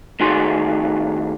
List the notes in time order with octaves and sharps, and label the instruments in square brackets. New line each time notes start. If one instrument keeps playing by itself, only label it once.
[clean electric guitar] A2 D#3 D#4 F#4 G#4 C6